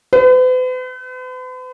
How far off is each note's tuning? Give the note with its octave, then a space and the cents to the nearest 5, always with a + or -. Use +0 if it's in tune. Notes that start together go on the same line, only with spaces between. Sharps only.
B4 +45